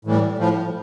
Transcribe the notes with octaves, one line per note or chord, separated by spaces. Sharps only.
A2 E3 G3
A2 F3